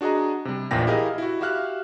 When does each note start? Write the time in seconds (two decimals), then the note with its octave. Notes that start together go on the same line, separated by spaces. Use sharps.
0.01 D4 F#4 G#4 D#5 A#5
0.45 C3 G3
0.71 A#1 E2 A#2 G5 A#6
0.87 E4 G4 G#4 A#4 D#5 F5
1.18 E4 F#4
1.41 F#4 G4 E5 F5 F6 F#6